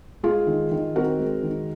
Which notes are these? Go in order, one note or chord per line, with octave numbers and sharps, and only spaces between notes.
G#3 F4 G#4
D#3
D#3
C4 F#4 A#4
G#3
D#3